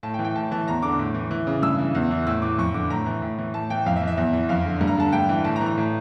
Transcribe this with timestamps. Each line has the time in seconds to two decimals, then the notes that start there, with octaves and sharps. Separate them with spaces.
0.03 A2 A5
0.14 G5
0.19 E3
0.25 G5
0.35 A2 A5
0.51 E3 A5
0.67 E2 A#5
0.83 D3 D6
0.99 A2
1.14 E3
1.31 E3
1.47 C#3
1.62 G2 E6
1.78 E3
1.95 E2
2.11 E3
2.27 A2 E6
2.42 E3 D6
2.58 F2 C#6
2.74 D3 D6
2.90 A2 A#5
3.06 E3
3.22 A2
3.38 E3
3.54 A2 A5
3.70 E3 G5
3.86 F2 F5
3.96 E5
4.01 E3
4.08 E5
4.17 E2
4.33 E3
4.49 F2 F5
4.66 D3
4.81 G2
4.87 A#5
4.98 D3 A5
5.13 G2 G5
5.29 E3
5.45 A2 A5
5.56 A#5
5.61 E3
5.66 A#5
5.77 A2